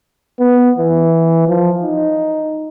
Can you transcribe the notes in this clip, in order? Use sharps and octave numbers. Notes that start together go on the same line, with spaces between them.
B3
E3
F3
D#4